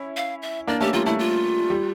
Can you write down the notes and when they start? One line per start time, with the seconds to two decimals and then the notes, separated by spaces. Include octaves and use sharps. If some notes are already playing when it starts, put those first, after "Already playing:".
Already playing: C#4 E4
0.17 F5
0.42 E5
0.67 A#3 D4 D5
0.81 A3 C#4 G4
0.93 G3 A#3 F4
1.06 A3 E4
1.19 F4
1.70 G3